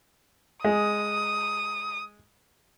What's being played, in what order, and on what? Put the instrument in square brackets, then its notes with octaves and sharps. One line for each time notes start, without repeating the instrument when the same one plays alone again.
[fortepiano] G#3 [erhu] D#6